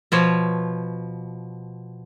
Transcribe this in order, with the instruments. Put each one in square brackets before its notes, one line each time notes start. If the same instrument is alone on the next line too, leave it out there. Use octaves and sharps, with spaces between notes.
[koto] B2 F3 C#5